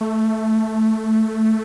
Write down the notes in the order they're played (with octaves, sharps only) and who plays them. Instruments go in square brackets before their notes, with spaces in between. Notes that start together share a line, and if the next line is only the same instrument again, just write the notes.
[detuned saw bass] A3